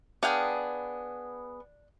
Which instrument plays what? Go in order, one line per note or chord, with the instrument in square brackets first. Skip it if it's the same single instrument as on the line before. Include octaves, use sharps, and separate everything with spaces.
[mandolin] B3 G#4 [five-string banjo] D4 F5 G5